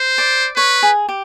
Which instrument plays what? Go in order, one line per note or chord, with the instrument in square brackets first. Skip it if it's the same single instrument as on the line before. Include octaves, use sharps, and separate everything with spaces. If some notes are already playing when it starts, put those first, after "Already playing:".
Already playing: [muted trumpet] C5
[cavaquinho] D5
[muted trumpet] B4 [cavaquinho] C#5
[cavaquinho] G#4
G4